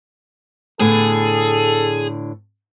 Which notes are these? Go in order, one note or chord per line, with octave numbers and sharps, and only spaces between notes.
A2 D3 B3 G#4 A4